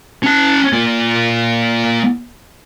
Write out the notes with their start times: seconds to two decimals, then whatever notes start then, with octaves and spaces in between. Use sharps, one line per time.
0.23 C#4 A5
0.73 A#3 F4